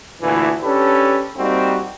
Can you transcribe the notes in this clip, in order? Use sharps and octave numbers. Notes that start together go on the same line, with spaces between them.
D2 A#2 E3
C#4 D4 G4 A4 B4
G3 A#3 C4 D#4 F#4